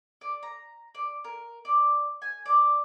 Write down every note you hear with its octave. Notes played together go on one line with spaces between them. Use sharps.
D5
A#5
D5
A#4
D5
G#5
D5